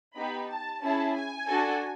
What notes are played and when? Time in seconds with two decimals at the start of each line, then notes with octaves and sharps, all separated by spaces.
0.15 B3 D#4 G4 B5
0.49 A5
0.82 C#4 E4 G#4 A5
1.15 G#5
1.49 D4 F#4 A4